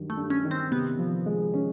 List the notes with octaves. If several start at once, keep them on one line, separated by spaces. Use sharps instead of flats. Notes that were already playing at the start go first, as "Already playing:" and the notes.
Already playing: G2 D#3 F#3
A3
G2
C#4
D#3
C4
C3 B3
F3
G#3
C#4